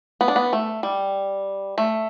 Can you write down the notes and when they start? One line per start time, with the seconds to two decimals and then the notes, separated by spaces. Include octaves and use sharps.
0.21 B3
0.28 D4
0.36 B3
0.53 A3
0.83 G3
1.78 A3